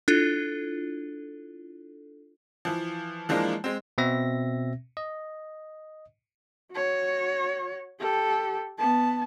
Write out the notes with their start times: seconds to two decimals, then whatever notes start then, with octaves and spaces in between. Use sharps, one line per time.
0.08 D4 E4 F4 A4
2.65 E3 F3
3.29 E3 F3 G#3 A#3 D4
3.64 G#3 C4
3.98 B2 C4 E5 A#6
4.97 D#5
6.72 F#4 C#5
8.00 G4 A4
8.78 B3 A5